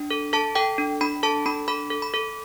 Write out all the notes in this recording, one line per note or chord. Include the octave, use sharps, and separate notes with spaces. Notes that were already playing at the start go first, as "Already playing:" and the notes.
Already playing: D4
A4
A4 A5
A4 G5
D4
D4 B5
A4 A5
D4 B5
A4 B5
A4
B5
A4